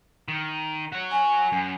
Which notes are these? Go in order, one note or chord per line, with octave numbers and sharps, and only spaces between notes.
D#3
F#4 C#5
G#5
F#2